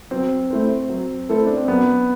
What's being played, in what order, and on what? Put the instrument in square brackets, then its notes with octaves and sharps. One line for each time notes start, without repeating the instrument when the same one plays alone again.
[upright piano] F#3 [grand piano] C4
[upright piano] A3 E4 A4 C5
F#3
A3 E4 A4 C5
[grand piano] D4
C4
[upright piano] F#2 [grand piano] B3